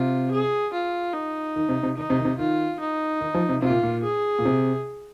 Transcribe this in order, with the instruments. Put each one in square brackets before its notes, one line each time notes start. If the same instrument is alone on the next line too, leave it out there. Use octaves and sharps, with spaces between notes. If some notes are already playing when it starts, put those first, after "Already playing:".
Already playing: [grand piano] C3 [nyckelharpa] F4
[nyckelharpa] G#4
F4
D#4
[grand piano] D#3
C3
C3
[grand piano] D#3 [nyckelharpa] D#4
[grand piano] C3
D#3
C3
[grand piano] D#3 [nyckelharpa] F4
[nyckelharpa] D#4
[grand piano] D#3
F3
C3
[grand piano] C3 [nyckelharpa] F4
[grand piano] A#2
A#2
[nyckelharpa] G#4
[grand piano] A#2
C3